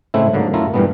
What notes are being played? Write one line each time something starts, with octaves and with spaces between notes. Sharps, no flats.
A2 C#3 G#3 A3 C4 E4
G#2 D3 F#3 A#3
F#2 A3 E4 F4 A#4
G2 A#2 E3 G3 A3 B3